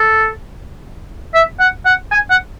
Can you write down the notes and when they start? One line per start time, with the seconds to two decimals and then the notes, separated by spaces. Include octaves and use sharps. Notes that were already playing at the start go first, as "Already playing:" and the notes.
Already playing: A4
1.35 E5
1.60 F#5
1.85 F#5
2.12 G#5
2.30 F#5